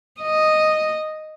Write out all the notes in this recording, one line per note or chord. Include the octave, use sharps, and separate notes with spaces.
D#5